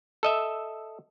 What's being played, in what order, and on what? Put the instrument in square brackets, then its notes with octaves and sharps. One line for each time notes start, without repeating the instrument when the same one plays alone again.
[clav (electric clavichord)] A4 D#5 E5